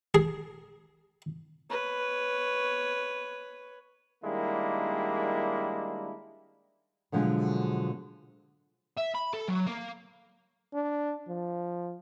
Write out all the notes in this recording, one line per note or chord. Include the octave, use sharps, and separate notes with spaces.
G#4
B4 C#5
D#3 G3 G#3 A#3 D4 E4
B2 D3 F3 F#3 G#3
E5
B5
A4
F#3
A#3
D4
F3